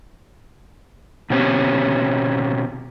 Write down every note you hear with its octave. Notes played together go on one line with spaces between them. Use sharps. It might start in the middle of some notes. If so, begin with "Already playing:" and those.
B2 C4 C#4 G4